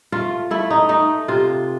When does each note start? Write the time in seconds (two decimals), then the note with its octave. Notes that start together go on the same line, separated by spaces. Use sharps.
0.12 A3 F4
0.51 A3 E4
0.70 D#4
0.89 A3 D#4
1.28 C3 F4